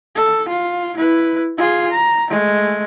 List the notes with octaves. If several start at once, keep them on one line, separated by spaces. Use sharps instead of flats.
A4
F4
E4 B4
F4 G#4
A#5
G#3 A3